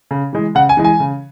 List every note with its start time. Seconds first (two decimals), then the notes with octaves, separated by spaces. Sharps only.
0.11 C#3
0.33 E3 G#3
0.55 C#3 F#5
0.69 G#5
0.77 E3 G#3
0.84 G#5
1.00 C#3